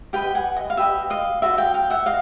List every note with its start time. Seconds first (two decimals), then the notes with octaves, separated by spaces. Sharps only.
0.13 G4 B4 D#5 F5 G5
0.35 F#5 G#5
0.57 D#5
0.70 F5
0.77 G4 B4 D#5 E5
1.10 D#5 F5
1.42 F#4 A4 C5 D#5 E5
1.58 F5 G5
1.74 F5 G5
1.90 E5 F#5
2.06 D#5 F5